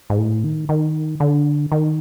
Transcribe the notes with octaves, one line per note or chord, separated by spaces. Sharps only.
G#2
A2
D#3
D#3
D3
D#3